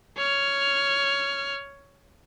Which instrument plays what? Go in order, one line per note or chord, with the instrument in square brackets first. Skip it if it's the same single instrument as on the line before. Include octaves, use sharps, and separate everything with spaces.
[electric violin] C#5 F6